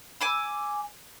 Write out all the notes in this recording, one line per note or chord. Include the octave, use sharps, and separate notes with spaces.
G#5 D6 E6